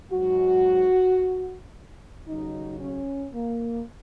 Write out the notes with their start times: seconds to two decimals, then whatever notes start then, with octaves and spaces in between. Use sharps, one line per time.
0.11 G#2 F#3 F#4
2.26 D#2 C#3 F#3 D#4
2.80 C#4
3.33 A#3